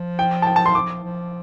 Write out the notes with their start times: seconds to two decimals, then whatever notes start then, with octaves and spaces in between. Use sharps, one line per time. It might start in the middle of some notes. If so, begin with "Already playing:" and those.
Already playing: F3
0.19 G5
0.42 A5
0.47 G5
0.56 A5
0.66 C6
0.75 F3 D6
1.03 F3